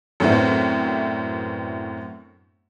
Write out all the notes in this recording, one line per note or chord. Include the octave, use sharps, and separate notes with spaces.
F#2 A2 B3 C4 D4 E4